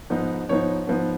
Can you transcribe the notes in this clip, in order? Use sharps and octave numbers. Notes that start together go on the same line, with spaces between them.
G#2 F3 B3 D#4
G#2 F3 B3 D#4 C#5
G#2 F3 B3 D#4